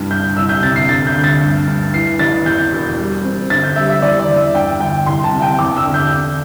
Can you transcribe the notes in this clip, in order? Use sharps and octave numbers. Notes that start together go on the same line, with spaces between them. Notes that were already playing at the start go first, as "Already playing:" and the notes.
Already playing: C2 G2
G2 G6
C2 E6
G6
C3 A6
C7
D3 A6
G6
D2
A6
G2
G2
E3 C7
A1 A6
E2 G6
E1
G3
C4
D3 A6
G6
G3 E5
E5
E2 D5
D5
E2
E5
G2 G5
G1 G5
C2 C6
A5
C3
G5
E2 D6
E6
D3
G6
D4